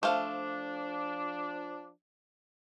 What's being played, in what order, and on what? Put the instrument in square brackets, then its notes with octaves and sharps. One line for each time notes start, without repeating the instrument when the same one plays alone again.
[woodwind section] F3 D4 [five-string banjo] A3 C5 F5